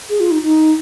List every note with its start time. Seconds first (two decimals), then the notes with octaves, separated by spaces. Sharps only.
0.09 G#4
0.20 F4
0.31 D#4
0.42 D#4